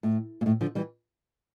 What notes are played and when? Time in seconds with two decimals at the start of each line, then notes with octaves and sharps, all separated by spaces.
0.03 A2
0.41 A#2
0.46 A2
0.61 D3 F3
0.75 E3 G3